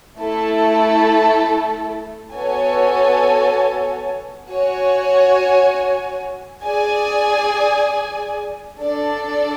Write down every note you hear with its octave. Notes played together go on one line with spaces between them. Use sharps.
A3 E4 A4
B3 F#4 A4 C#5 G#5
F#4 C#5 G#5
G#4 D5 G#5
D4 A4 D5